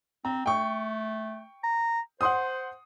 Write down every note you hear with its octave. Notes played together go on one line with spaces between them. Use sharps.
C4 A#5
A3 G5 C#6
A#5
C5 F#5 C6 D#6